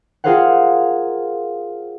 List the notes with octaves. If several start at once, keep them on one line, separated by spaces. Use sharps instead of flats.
F4 G#4 A#4 C5 F5 F#5